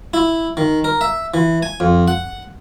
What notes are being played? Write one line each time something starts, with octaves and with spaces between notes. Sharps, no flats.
E4
D#3
A#4
E5
E3
G#5
F2
F#5